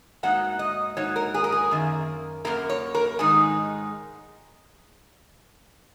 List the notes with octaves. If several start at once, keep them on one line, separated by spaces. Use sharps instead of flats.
G#2 F#3 A#3 D#4 F#5
D#5
G#2 F#3 A#3 D#4 C#5
A#4
G#4
A#4
G#4
F#2 D#3 A#3
F#2 D#3 A#3 A#4
C#5
A#4
G#2 D#3 G#3 D#4 G#4